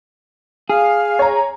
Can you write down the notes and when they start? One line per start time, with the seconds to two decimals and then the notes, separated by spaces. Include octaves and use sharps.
0.70 G#4 F5
1.19 C#5 A#5